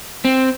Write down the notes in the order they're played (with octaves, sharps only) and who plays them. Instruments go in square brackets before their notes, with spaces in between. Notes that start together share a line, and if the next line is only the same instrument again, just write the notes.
[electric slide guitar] C4